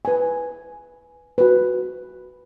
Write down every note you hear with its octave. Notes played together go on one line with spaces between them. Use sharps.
B4 G#5
F#4 B4